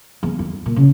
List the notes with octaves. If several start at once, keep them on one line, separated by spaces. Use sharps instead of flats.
E2
F2
A#2
C#3